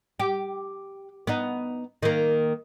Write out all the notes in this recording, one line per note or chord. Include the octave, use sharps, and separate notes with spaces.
G4
B3 D#4
D#3 A#3